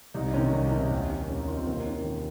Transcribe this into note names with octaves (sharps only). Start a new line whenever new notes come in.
C2 D#4
C3 D#3 C#4
C2
C3 D#3
D#2
D#3
D#2 C#4
D#4
D#3 F4
C4
D#2 A#3
D#3 C#4
D#2